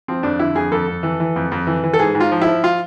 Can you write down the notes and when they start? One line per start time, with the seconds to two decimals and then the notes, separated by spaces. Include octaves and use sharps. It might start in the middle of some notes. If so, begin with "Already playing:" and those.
0.08 F3 C4
0.23 F2 D4
0.40 D3 E4
0.55 F2 G#4
0.72 F2 A4
0.88 F2
1.03 E3
1.20 E3
1.36 F2
1.52 F2
1.67 E3
1.84 E3
1.93 A4
1.99 G#2 G#4
2.15 G#2
2.20 F4
2.32 F3
2.42 E4
2.47 F3
2.64 F4